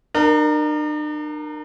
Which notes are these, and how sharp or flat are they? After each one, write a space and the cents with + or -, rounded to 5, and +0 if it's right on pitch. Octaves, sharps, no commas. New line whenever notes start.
D4 +45 A#4 +0